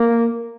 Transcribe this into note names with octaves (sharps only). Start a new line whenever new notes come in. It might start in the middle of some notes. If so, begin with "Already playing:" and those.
Already playing: A#3